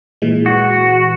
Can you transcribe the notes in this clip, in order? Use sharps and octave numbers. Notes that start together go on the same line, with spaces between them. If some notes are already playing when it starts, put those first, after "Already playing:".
A#2 E3 G#3
F#4